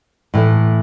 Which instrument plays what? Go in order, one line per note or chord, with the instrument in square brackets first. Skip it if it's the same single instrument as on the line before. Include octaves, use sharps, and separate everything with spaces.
[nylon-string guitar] A2 E3 A3